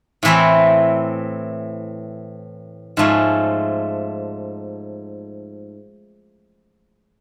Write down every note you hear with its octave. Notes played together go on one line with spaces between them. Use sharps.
A2 E3 A3 C4 E4
G#2 F3 A3 C#4